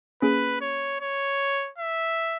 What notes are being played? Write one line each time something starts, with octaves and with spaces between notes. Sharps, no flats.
A#3 C#4 G#4 B4
C#5
C#5
E5